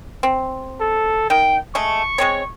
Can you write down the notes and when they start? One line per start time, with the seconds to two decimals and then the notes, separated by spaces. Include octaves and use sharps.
0.23 C4
0.80 A4
1.30 D#3 G5
1.75 G#3 A3 C#6
2.18 G#3 C4 C#5